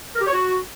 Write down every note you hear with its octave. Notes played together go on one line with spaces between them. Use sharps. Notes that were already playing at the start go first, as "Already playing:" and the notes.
A#4
G4
C#5
F#4